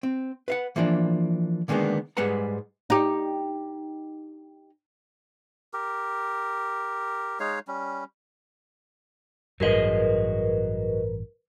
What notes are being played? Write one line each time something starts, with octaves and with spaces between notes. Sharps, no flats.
C4
B4 F5 F#5
E3 F3 A#3 D4
D3 D#3 G#3 A#3 B3 D4
G#2 G3 G#3 B4 F#5 A#5
D#4 G4
G4 A#4
G#3 D#4 C#5 F5
G3 C#4
A1 G2 F#3 G#4 A#4 B4 D#5